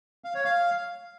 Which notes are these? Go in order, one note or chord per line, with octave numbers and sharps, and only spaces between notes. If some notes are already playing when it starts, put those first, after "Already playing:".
F5
C#5
F5